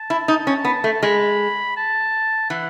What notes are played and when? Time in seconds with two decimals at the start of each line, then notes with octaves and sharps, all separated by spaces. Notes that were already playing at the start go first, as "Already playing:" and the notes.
Already playing: A5
0.10 E4
0.28 D#4
0.47 C#4
0.65 B3
0.84 A3
1.03 G#3 B5
1.77 A5
2.50 E3 F#5